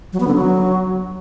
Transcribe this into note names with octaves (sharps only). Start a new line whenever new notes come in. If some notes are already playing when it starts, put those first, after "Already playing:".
F#3
B3
D3
F#3